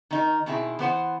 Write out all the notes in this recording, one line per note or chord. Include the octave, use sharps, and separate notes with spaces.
D#3 D#4 A#4
B2 D#3 C4 E4 F#4 G#4
E3 B3 C5 F#5